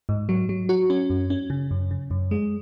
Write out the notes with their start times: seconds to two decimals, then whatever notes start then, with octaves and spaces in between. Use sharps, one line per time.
0.09 G#2
0.29 F#3
0.49 F#3
0.69 F#4
0.90 C#4
1.10 F#2
1.30 C#4
1.50 C#3
1.71 F#2
1.91 C#3
2.11 F#2
2.31 G#3